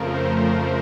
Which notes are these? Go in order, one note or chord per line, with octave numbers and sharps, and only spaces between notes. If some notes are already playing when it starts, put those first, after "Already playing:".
Already playing: F2 C#3 F3 A3 A#4
C5